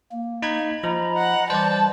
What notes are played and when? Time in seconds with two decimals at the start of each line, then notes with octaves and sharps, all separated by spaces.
0.12 A#3
0.42 D#4 B5 G#6
0.84 F3 D#5 A#5 B5
1.17 F#5
1.50 E3 G3 C5 D5 A5